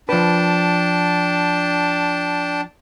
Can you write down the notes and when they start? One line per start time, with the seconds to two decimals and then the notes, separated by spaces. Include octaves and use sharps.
0.09 F3 D4 B4 G5 A5